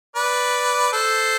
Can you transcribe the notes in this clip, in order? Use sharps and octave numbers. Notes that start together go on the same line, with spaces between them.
B4 D5
A4 C5